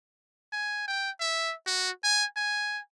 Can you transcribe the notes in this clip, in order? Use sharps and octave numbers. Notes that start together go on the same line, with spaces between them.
G#5
G5
E5
F#4
G#5
G#5